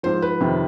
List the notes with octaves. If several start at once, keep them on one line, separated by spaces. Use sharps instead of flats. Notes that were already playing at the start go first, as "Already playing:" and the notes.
G#2 F3 C5
B4
F2 C3 D#3